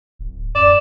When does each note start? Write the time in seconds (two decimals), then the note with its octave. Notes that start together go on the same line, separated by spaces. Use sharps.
0.19 D1
0.55 F#2 D5 E7